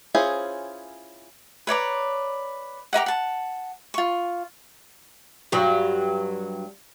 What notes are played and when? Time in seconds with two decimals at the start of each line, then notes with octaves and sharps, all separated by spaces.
0.14 C#4 E4 F4 G#4 C5
1.67 B4 C#5 D5 A#5
2.93 G4 A#4 D#5 F#5
3.06 F#5 A5
3.94 F4 C#6
5.52 G2 F#3